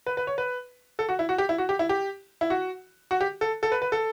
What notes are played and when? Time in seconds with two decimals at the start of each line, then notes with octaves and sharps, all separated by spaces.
0.06 B4
0.17 B4
0.27 C#5
0.38 B4
0.99 A4
1.09 F#4
1.19 E4
1.29 F#4
1.38 G4
1.49 E4
1.58 F#4
1.69 G4
1.79 E4
1.89 G4
2.41 E4
2.50 F#4
3.11 F#4
3.21 G4
3.41 A4
3.63 A4
3.72 B4
3.82 B4
3.92 A4